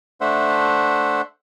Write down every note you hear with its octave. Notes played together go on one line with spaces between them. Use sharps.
A3 D4 C5 E5 F#5